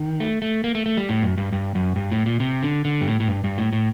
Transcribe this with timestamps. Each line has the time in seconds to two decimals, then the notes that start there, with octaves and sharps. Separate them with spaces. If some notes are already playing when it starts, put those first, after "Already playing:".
Already playing: D#3
0.20 A3
0.42 A3
0.64 A#3
0.75 A3
0.86 A3
0.97 G3
1.09 A2
1.22 F#2
1.37 G2
1.52 G2
1.75 F#2
1.96 G2
2.12 A2
2.26 A#2
2.40 C3
2.62 D3
2.85 D3
3.01 G2
3.07 A2
3.20 A2
3.28 G2
3.44 G2
3.58 A2
3.73 A2